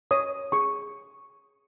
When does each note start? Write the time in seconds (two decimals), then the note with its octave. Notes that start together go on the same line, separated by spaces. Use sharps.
0.11 C#5 D#6
0.52 G#4 C#6